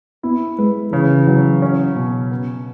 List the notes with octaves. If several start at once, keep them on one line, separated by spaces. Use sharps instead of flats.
B3 E4
G#3 B4
C#3 E3
F#3
C#4
B2
B3